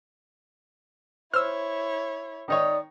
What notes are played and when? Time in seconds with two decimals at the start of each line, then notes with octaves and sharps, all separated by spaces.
1.34 E4 C5 C#5 E6 F6
2.48 D#3 D#4 C#5 D5 D#6